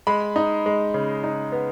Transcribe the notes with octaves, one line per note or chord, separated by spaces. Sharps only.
G#3 B5
D#4
G#3
C#3
D#4
B3